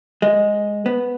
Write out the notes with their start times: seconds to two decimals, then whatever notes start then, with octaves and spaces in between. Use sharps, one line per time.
0.22 G#3
0.86 B3